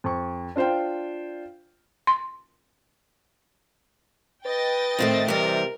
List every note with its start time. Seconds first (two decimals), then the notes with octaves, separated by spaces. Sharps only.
0.04 F2 C#6
0.56 D4 F4 C5 F5 G5
2.07 C6
4.45 B4 D#5 G5 A6
4.99 A2 D#3 A3 C4
5.28 C3 E3 G3 A#4